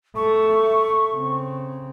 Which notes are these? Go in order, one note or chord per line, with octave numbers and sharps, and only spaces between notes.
A3 C#6
C#3 C4